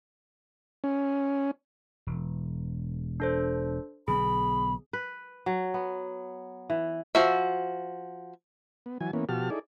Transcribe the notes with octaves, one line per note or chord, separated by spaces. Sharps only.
C#4
E1
D4 A4 C5
B1 D3 B3 G#4 B5
B4
F#3
B3
E3
F3 F#4 E5
B3
E3 F#3 G#5
E3 A#3 B3 C#4
B2 F3 F#4 G4 A5 F6
D#4 E4 G#4 A4 D5